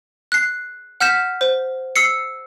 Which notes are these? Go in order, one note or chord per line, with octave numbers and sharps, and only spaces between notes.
F#6 C7
F#5 F6 G6 B6 E7
C5
E6 C7 C#7